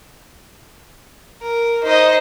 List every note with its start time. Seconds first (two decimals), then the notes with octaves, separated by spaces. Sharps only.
1.41 A#4
1.83 D#4 C5 D#5